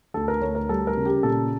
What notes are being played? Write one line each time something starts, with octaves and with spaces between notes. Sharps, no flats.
D2 A4
A#4
D2 C#5
A#4
G3 A4
A#4
C#3
G4
A#2 A4